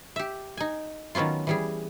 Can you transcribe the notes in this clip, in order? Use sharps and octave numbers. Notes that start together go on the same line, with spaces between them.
G4 E5
D#4 G#5
D#3 F#3 B3 C#4 F4
E3 G3 G#4